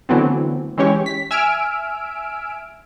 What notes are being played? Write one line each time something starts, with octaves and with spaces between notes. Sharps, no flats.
D3 E3 F#3 A3 B3 C4
E3 G#3 C#4 G4 C#5
B6
E5 G#5 E6 F6 D7